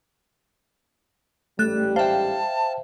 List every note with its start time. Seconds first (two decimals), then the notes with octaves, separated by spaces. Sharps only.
1.59 A1 G#2 G3 A3 A4 F#6
1.96 C5 E5 F5 G5 A5